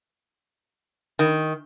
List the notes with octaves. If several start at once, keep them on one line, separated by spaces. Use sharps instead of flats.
D#3